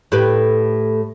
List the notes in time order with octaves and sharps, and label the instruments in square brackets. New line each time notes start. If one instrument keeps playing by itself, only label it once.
[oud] A2 G4 B4